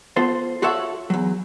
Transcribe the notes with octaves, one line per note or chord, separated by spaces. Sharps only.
B3 F4 A4 C5
F4 F#4 A4 C#5 E5 F#5
E2 F#3